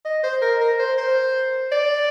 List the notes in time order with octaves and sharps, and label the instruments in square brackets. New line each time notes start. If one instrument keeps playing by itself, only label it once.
[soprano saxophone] D#5
C5
A#4
A#4
C5
C5
D5